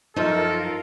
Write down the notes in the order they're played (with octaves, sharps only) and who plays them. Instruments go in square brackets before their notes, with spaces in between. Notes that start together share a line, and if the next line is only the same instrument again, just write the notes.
[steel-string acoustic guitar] F#2 F3 [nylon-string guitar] D#4 [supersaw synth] F4 A#4 [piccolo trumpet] A4